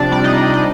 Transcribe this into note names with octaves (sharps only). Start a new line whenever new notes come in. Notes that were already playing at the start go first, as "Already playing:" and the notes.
Already playing: C3 F3 D4 D5
G3 D5
D#4 D#5
G3
D#5